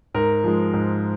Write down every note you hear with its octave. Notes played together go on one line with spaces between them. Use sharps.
G#2 A#4
F3 G#3
G#2